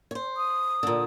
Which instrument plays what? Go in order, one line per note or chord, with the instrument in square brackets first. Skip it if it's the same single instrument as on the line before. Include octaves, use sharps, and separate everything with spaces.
[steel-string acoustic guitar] C5 C#5
[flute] D#6
[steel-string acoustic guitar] A#2 D3